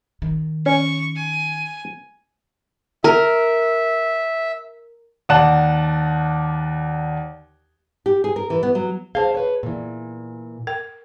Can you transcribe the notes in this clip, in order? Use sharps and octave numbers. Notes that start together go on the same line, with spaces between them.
D#3
C#4 C#6
G#5
A#4 E5
D#2 D5 F#5 A5 F#6 E7
G4
G#4
A#4
E3
B3
F#3
G#4 C5 D5 F5 A5
B4 C#5
A#2 E3
A#4 G5